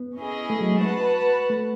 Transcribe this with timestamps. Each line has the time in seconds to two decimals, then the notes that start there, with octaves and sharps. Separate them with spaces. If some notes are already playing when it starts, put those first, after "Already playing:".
Already playing: B3
0.17 C#4 E4 G#4 D#5
0.50 A3
0.61 F#3
0.72 G#3
0.83 F#4 B4 F#5 A5
1.50 A3